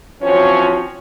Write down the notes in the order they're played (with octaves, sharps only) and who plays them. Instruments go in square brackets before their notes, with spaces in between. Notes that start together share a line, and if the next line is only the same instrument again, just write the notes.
[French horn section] E3 F3 C4 C#4 F#4 C#5